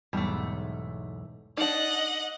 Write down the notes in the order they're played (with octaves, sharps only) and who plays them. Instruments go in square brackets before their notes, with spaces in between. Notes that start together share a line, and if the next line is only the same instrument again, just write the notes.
[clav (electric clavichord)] B1 E2 G#2 [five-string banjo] G3 A3
[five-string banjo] D4 D#4 [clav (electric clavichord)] D5 [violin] D#5 F#5